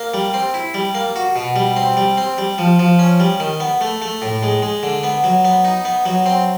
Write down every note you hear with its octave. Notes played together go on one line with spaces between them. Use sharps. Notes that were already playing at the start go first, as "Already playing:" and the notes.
Already playing: A#3
G3
C4
E4
G3
A#3
F#4
B2
G3
C4
G3
C4
G3
F3
F3
C#4
G3
D#3
B3
A3
A3
A2
G#3
G#3
D3
B3
F#3
B3
D#4
B3
F#3
C4